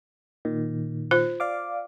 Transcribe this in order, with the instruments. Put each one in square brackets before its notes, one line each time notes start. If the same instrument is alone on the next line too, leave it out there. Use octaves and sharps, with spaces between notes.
[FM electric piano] A#2 D#3
[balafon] F4 C5
[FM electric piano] D5 F5 D6